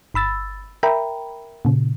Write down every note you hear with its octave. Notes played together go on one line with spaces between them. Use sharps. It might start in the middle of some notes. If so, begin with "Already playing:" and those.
G1 B5 E6 A6
A#4 E5 G5 A#5 B5
A#2 C#3